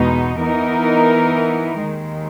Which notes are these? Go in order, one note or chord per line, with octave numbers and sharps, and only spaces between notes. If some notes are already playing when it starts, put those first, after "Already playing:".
Already playing: E2 B2 G#3 B3 D#4
E3 B3 D#4 A#4
D#2 D#3 G#3